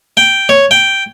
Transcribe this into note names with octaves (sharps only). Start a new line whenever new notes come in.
G5
C#5
G5